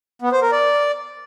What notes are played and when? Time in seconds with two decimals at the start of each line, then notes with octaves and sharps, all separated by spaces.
0.22 B3
0.32 C5
0.42 A#4
0.52 D5